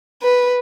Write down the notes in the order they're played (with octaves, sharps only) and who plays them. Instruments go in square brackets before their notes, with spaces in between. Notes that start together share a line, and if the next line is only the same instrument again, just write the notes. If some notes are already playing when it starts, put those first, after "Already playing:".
[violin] B4